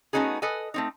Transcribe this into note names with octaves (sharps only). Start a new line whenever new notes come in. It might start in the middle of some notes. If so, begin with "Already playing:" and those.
A3 B3 C#4 D#4 F#4 G#4
A4 B4 D#5 G#5
A3 C4 D#4